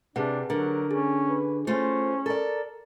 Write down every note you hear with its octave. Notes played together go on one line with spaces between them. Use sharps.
C3 D4 G#4 B4 F#5
D3 F#3 A#4
C#4 G#4
B4
A3 C#4 F4 C5
A4 A#4 D5